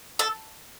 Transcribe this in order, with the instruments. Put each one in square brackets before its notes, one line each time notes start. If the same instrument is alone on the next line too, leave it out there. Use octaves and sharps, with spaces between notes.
[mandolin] A4